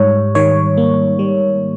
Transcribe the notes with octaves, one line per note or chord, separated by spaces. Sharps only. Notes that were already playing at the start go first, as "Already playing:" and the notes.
Already playing: G#2 G3 C#5
D#3 C#5
A#3
G3